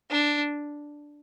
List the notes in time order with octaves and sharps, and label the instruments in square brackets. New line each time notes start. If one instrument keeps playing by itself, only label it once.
[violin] D4